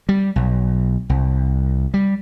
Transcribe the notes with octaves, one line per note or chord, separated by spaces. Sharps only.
G3
B1
C2
G3